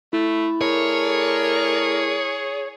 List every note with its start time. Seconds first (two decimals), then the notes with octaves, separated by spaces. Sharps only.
0.13 A3 E4
0.61 A3 G#4 A#4 C#5 D5